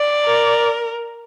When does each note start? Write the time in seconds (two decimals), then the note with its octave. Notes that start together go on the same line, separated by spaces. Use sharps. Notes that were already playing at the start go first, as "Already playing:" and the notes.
Already playing: D5
0.25 A#4